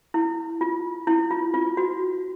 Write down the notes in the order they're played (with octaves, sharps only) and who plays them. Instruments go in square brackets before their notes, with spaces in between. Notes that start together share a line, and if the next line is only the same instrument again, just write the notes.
[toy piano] E4
F4
E4
F4
F4
F#4